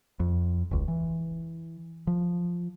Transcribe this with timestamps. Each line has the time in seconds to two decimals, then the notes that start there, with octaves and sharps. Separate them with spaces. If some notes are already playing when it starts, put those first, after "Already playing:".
0.20 F2
0.71 E1 C#2
0.88 E3
2.07 F3